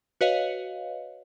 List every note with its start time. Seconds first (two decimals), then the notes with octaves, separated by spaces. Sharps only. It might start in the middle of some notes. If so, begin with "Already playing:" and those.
0.21 F#4 B4 C#5 D#5 F5